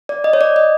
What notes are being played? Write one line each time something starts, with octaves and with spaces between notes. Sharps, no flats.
D5
D#5
C#5
D5
D#5